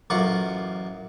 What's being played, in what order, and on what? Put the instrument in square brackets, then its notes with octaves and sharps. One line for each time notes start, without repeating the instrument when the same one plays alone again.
[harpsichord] A1 F#2 F4 F#5 C#6 D6